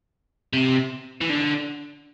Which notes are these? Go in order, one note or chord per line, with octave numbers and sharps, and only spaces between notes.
C3
E3
D3